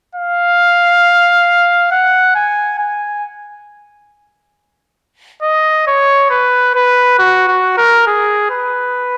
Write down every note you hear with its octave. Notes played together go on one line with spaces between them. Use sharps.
F5
F#5
G#5
G#5
D#5
C#5
B4
B4
F#4
F#4
A#4
G#4
B4